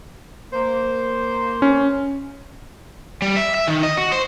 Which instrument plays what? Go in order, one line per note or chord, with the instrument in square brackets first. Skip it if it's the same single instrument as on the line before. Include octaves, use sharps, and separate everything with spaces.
[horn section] A#3 C5
[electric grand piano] C#4
[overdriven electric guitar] G3
E5
E5
D#3
D#5
F#4
C5